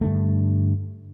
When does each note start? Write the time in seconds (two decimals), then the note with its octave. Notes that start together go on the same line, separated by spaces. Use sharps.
0.01 G2 D3 A3